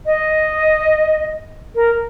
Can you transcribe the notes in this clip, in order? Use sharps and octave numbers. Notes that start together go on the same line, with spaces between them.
D#5
A#4